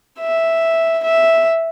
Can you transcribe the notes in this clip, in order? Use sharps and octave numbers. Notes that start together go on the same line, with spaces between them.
E5
E5